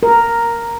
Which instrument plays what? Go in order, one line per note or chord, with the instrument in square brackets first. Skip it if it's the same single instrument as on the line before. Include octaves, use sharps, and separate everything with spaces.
[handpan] A#4